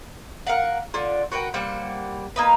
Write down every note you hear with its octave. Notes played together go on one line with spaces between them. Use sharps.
A#4 F5 F#5
D3 F4
F#4 A#4 B4 G5
G3 A#3 C5 F#5
A#3 D#4 B4